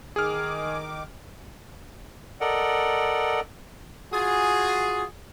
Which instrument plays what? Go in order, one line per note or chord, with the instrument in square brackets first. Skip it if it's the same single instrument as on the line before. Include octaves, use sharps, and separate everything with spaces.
[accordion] D#3 D6 [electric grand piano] G#4 F6
[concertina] A4 A#4 D5 D#5 F#5
[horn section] F4 F#4 G#4